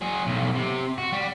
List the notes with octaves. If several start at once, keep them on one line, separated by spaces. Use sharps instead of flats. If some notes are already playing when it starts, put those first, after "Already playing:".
F#3 G#4
B1 A2
C3
F#4
G3